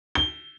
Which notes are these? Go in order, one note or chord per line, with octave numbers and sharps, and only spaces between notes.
G7